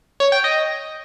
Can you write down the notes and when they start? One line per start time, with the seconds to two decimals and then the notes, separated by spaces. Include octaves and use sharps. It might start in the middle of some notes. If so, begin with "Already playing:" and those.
0.20 C#5
0.32 G5
0.44 D#5